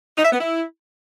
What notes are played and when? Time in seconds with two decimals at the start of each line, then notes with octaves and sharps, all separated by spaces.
0.17 D#4
0.25 E5
0.32 B3
0.40 E4